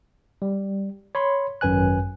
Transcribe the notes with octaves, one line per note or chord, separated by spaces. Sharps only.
G3
C#5 B5 C6
G#1 F#2 B4 G#5 F#6